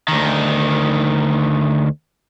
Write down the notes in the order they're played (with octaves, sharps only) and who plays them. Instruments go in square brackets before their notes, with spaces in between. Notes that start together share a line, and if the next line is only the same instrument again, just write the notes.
[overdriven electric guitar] D2 D#3